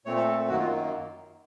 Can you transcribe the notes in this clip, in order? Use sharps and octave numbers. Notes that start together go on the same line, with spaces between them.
A#2 A3 C4 C#5
A4
A4
F#2 D#3 F#3 A#3 F#4
F4